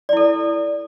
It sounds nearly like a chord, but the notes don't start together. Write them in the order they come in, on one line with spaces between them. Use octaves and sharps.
D5 E4 A4